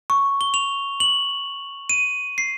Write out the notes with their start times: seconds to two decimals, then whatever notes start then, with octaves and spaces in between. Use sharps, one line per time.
0.10 C#6
0.41 G7
0.54 F7
1.00 F#7
1.90 D#7
2.38 C7